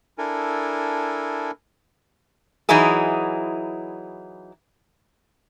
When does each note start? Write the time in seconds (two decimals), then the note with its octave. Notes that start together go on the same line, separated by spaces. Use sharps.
0.18 D4 E4 A4 A#4 G#5
2.69 E3 F#3 D#4 E4 G#4